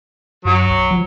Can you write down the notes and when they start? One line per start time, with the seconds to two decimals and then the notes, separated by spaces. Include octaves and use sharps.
0.45 F#2 F#3
0.70 B1
0.91 F3